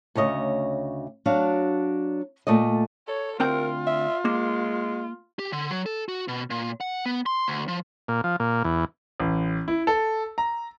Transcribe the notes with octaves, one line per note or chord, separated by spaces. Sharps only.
D2 C#3 C#5 D#5
F#3 D4 F#4 F5
A#2 A3 D5 D#5
A4 C#5
D2 C4 F4 A#4 G5
E5
G#3 A#3
G4
D3
F#3
A4
F#4
B2
A#2
F#5
B3
C6
D2
F3
A#2
F3
A#2
E2
A1
E4
A4
A#5